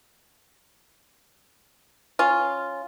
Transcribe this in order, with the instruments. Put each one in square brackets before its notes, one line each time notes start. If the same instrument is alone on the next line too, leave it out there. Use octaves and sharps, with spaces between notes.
[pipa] C#4 F4